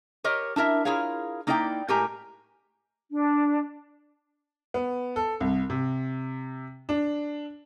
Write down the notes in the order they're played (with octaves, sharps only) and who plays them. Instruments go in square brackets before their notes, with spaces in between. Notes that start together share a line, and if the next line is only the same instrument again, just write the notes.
[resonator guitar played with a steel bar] G4 A#4 C#5 D#5
D4 E4 A#4 E5
E4 F4 G#4 A#4 C#5 F5
A#3 D#4 E4 D5 D#5 G5
A2 G#3 G4 A#4 G#5 A#5
[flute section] D4
[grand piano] B3
A4
C2
C3
D4